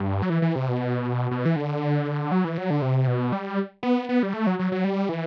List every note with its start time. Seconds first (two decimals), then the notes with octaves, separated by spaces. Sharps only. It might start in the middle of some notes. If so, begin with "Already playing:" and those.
Already playing: G2
0.22 F#3
0.30 E3
0.42 E3
0.55 C3
0.68 B2
1.31 B2
1.45 E3
1.56 D3
2.32 F#3
2.45 E3
2.58 F#3
2.70 D3
2.82 C3
3.07 B2
3.32 G3
3.83 B3
4.09 B3
4.23 G3
4.33 A3
4.47 F#3
4.59 F#3
4.72 F#3
4.84 G3
5.09 E3